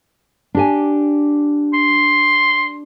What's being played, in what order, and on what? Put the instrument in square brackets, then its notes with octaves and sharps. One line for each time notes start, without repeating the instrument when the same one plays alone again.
[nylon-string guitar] D4 G4 G#5
[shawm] C6